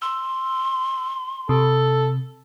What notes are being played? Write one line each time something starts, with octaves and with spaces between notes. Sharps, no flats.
C6 E6
C3 A4